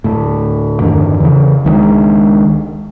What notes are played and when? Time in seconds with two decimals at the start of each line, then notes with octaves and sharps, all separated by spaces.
0.04 D2 A2
0.80 E2 G2 D3 D#3
1.20 C#3 E3
1.65 C#2 D#3 E3 G#3